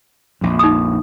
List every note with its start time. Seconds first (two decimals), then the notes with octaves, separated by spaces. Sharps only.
0.41 A#1 F2
0.59 D#4 D#6